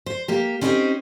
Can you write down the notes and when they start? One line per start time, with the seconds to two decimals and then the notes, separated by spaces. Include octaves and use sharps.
0.06 C5
0.28 A#3 G4
0.61 C4 C#4 D#4 G4 B4 C5